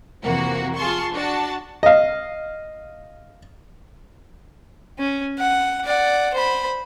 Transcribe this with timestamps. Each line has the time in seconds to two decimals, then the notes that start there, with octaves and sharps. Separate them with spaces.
0.22 F2 C3 E3 A#3 F#4 A#4
0.76 F4 G#4 A5 C6 C#6
1.12 D4 F#4 A5
1.83 D#5 F5
4.99 C#4
5.39 F#5
5.84 D5 F#5
6.34 C5 B5